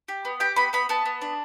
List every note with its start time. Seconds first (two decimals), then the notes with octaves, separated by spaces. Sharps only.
0.08 G4
0.25 B3
0.40 G4 G5
0.56 B3 B5
0.73 B3 B5
0.89 B3 A5
1.05 B3
1.22 D4